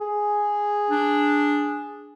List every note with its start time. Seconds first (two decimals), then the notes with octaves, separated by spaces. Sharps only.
0.01 G#4
0.90 D4